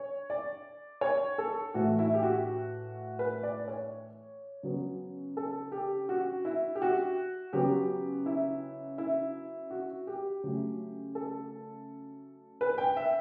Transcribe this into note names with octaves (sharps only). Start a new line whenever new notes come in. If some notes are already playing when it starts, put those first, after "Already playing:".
Already playing: C#5
D5
C#5
A4
A2 E3 A3 F#4
E4
G4
F#4
B4
D5
C#5
C#3 F#3 B3
A4
G4
F#4
E4
G4
F#4
C#3 F#3 B3 G4
E4
E4
F#4
G4
C#3 F#3 A3
A4
B4
G5
E5